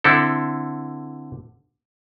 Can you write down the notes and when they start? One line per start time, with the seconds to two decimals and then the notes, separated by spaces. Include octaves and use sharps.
0.04 D3 C4 E4 A4